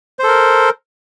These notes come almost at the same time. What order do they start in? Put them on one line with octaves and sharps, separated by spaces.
C5 A4 A#4